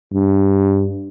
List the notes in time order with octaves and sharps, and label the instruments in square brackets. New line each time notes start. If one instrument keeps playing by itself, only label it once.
[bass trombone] G2